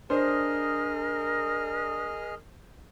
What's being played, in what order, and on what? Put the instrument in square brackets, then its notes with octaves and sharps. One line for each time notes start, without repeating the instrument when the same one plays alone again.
[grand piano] D4 [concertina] G#4 D#5 F6 [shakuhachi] A#4 [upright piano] C5